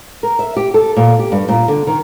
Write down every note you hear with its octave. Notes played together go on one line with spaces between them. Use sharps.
A#4
E5
G4
A4
A#2
G4
G2
A#2
D3
D#3